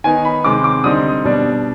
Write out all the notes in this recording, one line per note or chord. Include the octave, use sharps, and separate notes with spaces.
D#3 B3 D#4 G#5
B5
C3 D#3 G#3 C4 D6
D6
D3 G3 C4 D#4 D#6
B2 G3 D4